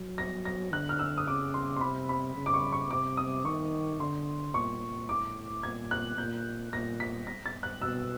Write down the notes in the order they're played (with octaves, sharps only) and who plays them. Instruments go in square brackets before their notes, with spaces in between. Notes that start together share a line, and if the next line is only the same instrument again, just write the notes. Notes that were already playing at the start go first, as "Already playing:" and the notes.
Already playing: [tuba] F#3
[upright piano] A#6
A#6
[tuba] D3 [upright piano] F#6
[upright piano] F6
E6
D#6
[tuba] C#3 [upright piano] D6
[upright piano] C6
C6
[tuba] C3 [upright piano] B5
[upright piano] B5
[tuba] C#3
[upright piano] D6
C#6
C#6
[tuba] C3 [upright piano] D6
[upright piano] D#6
[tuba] D#3 [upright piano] C#6
[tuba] D3 [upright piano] C6
[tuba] A#2 [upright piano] C#6
[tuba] A2 [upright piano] D6
[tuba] A#2 [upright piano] G#6
[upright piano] F#6
[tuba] A#2 [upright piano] G6
[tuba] A#2 [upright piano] A#6
[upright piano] B6
A#6
A6
F#6
[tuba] B2 [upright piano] E6